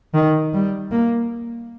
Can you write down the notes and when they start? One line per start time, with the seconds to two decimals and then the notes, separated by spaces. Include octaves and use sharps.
0.14 D#3
0.53 G3
0.91 A#3